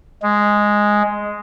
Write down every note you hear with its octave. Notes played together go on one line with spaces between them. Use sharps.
G#3